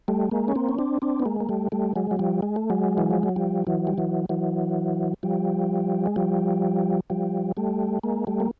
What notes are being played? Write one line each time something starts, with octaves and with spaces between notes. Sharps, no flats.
G3 A3
G#3 A#3
C#4
A#3 C4
C#4
C4 D4
C4 D4
B3
G#3 A#3
A#3
G3 A3
G3 A3
F#3 G#3
F#3
F3 G3
G#3
A3
F#3 G#3
E3
F3
F#3
F3 G3
E3 F#3
G3
E3 F#3
E3 F#3
F3 G3
G#3
F3 G3
F3 G3
G3 A3
G#3 A#3
G3 A3
A#3